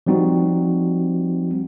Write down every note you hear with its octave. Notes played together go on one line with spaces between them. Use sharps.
F3 G3 C4 D#4 F#4